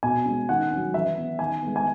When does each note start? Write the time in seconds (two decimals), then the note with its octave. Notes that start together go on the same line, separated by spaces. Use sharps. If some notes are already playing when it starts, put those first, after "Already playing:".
0.03 B2 G#5
0.26 G#3 C#4
0.49 D#3 F#5
0.71 C#4
0.76 F#3
0.94 E3 E5
1.17 B3
1.39 D#3 G#5
1.63 G#3 B3
1.76 G#5